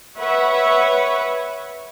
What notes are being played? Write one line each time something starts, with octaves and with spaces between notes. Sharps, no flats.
B4 C#5 E5 F#5